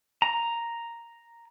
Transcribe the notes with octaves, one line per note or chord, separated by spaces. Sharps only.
A#5